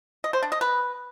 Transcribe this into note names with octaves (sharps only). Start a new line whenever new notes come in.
D#5
C5
D4
D#5
B4